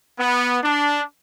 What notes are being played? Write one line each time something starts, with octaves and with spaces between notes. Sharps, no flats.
B3
D4